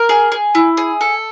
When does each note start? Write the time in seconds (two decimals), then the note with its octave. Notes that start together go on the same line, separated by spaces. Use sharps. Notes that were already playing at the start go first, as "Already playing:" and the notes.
Already playing: A#4
0.09 G#4
0.32 G#4
0.55 E4
0.77 G#4
1.01 A4